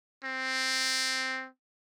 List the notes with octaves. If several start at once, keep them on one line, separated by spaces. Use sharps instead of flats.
C4